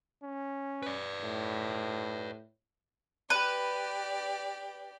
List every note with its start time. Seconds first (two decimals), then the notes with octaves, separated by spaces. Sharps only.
0.23 C#4
0.83 B4 D5
1.23 A2
3.30 G4 B4 D5